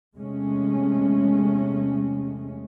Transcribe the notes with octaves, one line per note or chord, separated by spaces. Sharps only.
E2 C3 G#3 A3 C#4